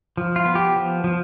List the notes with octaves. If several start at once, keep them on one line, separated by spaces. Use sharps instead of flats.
F3
F4
B3
G4
F3
F3